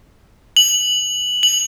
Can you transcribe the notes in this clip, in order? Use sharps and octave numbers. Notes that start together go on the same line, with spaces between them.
F#7
F#7